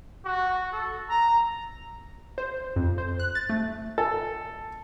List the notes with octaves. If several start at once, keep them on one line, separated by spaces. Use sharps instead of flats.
F#4
A4
A#5
C5
F2
C5
F#6
A6
A3
A4